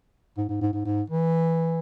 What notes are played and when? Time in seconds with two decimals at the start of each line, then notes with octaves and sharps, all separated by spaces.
0.37 G#2
0.49 G#2
0.61 G#2
0.73 G#2
0.85 G#2
1.10 E3